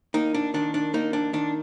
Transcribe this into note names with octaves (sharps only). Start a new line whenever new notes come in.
A#3 D#4
D4
D#3 D4
D4
A#3 D#4
D4
D#3 D4